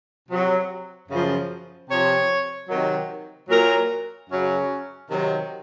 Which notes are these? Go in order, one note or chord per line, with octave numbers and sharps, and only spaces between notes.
C3 F#3
F#2 C#3 F3
C3 F3 C#5
C3 D#3 F#3
A#2 F#3 A#4
F#2 C#3 F#3 C#4
C3 D#3 F#3